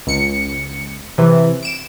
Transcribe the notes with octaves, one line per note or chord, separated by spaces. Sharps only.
C#2 C#7
C3 E3
D7 E7